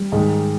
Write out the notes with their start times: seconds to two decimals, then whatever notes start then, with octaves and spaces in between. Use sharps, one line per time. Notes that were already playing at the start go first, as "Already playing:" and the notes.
Already playing: G3
0.12 G#2 D#3 G#3